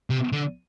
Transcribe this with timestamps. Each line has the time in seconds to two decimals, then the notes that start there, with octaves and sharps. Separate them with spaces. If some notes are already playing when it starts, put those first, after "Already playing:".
0.10 C3
0.33 D3